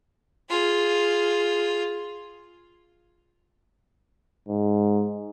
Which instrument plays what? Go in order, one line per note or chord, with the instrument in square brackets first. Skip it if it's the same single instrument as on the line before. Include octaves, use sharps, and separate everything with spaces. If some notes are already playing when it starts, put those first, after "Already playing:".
[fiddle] F4 G#4
[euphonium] G#2